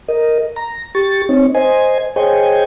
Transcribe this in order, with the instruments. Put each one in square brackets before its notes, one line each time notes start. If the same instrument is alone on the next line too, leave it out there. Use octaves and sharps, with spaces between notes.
[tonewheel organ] A#4 D#5
A#5
G4 C#6 A6
C4 D#4 C#5
C5 D#5 G#5
G#4 C5 C#5 D#5 G5 G#5